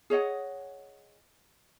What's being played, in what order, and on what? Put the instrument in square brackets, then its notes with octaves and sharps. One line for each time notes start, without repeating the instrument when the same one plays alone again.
[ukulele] G#4 C#5 D#5 F#5